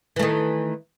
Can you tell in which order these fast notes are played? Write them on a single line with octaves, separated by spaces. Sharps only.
E3 A3 D#3